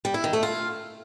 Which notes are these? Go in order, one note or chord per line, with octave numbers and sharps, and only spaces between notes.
G3
E4
D#3
A3
F4